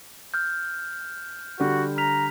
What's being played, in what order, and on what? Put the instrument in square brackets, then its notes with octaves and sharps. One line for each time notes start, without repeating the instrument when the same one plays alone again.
[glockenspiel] F6 G6
[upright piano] D3 G3 [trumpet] F#4
[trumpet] A#5 [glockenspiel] F6 B6 F7